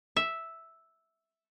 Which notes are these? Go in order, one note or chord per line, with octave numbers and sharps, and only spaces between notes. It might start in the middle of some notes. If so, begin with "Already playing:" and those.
E5